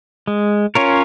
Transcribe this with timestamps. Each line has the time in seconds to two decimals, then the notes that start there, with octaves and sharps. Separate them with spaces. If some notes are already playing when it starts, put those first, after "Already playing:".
0.27 G#3
0.75 C#4 F4 A#4 C#5